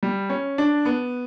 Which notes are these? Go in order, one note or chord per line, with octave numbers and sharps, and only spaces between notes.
G3
C#4
D4
B3